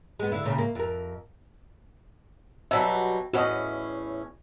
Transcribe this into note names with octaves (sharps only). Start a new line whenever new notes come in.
G#3 B3
D3 E4
A#2 C#3
A#3
F2 A#4
B2 F#3 G3 E5
E2 A2 C#4 F#4 D#5